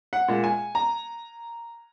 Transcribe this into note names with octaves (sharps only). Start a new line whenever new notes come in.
F#5
A#2 G#3
G#5
A#5